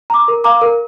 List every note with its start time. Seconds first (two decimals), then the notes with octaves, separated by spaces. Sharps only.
0.10 A#5 D6
0.28 A#4
0.44 F5 A#5 D6
0.61 A#4